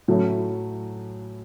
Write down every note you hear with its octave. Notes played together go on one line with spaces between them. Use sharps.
A2 F#3 A3 C#4 E4